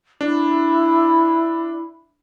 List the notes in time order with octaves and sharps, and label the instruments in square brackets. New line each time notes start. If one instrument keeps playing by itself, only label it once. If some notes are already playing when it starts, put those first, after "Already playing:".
[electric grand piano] D4 [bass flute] E4